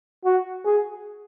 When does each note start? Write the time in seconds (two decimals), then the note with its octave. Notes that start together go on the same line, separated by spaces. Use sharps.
0.25 F#4
0.65 G#4